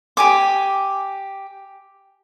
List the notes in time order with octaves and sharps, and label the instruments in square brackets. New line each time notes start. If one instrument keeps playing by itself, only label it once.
[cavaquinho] G4 G#5 D6